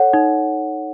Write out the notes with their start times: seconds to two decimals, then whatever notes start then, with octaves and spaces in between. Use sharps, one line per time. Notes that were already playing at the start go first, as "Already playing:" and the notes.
Already playing: A4 C#5 F#5
0.13 D#4